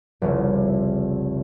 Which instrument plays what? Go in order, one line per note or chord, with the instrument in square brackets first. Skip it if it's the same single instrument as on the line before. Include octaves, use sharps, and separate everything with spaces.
[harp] F1 C2 C#3